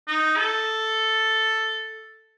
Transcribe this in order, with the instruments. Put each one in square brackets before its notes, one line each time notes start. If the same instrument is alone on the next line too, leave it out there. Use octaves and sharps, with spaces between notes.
[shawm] D#4
A4